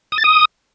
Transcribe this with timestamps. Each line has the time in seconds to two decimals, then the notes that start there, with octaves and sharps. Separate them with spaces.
0.12 D#6
0.18 A6
0.24 D#6